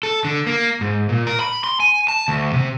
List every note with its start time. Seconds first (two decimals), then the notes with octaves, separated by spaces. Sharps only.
0.03 A4
0.25 D3
0.47 A#3
0.81 G#2
1.09 A#2
1.27 A#4
1.40 B5
1.64 C6
1.80 G#5
2.08 A5
2.28 D2
2.53 C3